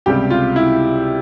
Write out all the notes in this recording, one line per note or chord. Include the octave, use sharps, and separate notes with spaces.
C#2 C3 G3 G4
F4
E4